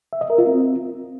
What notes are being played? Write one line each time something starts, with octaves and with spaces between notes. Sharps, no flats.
E5
D#5
A#4
F4
C4